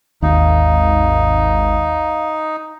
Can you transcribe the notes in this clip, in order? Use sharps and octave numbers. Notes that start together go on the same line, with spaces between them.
G#1 D#2 D#4 F5